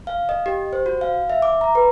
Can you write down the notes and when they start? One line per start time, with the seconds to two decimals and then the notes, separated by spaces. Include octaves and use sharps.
0.07 F5
0.29 D#5
0.46 G4
0.73 C5
0.86 F#4
1.01 F5
1.30 E5
1.42 D6
1.61 A#5
1.75 B4